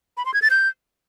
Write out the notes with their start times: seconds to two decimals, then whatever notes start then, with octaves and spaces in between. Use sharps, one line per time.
0.17 B5
0.26 C6
0.34 G#6
0.42 A6
0.50 G6